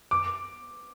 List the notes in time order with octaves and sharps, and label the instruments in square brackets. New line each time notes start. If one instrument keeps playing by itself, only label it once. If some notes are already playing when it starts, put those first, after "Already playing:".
[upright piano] D6